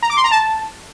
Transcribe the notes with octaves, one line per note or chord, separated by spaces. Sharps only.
A#5
D6
C6
A#5
A5